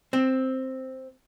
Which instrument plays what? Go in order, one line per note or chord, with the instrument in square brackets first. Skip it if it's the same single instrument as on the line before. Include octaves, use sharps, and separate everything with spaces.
[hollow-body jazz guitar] C4